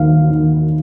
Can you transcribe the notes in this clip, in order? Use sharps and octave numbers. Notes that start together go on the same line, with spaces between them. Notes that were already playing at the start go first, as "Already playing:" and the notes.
Already playing: D#2 D#3 F5
D#3